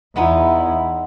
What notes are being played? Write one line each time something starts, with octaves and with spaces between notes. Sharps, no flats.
E2 G#3 B3 D#4 E4